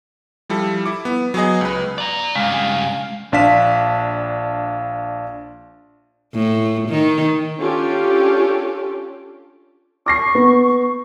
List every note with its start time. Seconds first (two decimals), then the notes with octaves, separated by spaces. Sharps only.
0.49 F3 G3 E4 A4
0.86 E4 D6
1.05 B3
1.34 F#3 B3 G#4 D#5
1.61 C#2 B4
1.98 D5 A#5
2.36 G2 C#3 G#3 F5
3.32 A#1 D4 F5 B6 E7
6.34 A2
6.89 D#3
7.60 C#4 D4 F4 G4 A4
10.06 C#6 D6 A#6 C7
10.35 B3